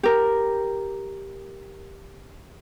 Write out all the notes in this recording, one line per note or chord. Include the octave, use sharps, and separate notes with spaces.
G4 A#4